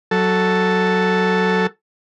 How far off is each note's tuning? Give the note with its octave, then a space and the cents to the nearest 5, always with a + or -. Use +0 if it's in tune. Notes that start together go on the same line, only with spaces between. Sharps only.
F#3 +0 A4 +0